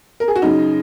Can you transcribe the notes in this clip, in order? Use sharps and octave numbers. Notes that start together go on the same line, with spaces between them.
A#4
G#4
F#4
F#2 C#3 D#4